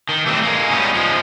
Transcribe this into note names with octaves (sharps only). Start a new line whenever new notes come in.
D#3
E3 G3 A3 B3 C4
G#3 A#3
G3 B3 C#4 D#4
F3 G#3